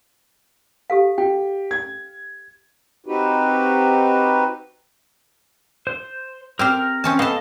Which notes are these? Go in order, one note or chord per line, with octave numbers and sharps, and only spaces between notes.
G4 A4 F5
G4 G5
G#6
C4 D#4 F#4 G4 B4
C5
C4 G4 A#4 C5 F6
C4 C#4 A5
B3 A4 D#5 F5 A5